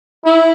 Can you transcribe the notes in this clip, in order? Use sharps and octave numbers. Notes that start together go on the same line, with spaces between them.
E4